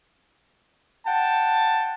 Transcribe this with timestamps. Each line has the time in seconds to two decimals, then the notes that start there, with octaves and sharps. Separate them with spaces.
1.07 F#5 G5 A5